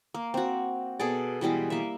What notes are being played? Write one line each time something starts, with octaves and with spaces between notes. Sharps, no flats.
A#3
C4 F#4
B2 G#4 A4 D5
B2 E3 G3 G#3
A#3 E5